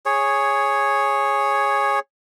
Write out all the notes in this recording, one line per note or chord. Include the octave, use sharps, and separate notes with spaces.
G#4 C#5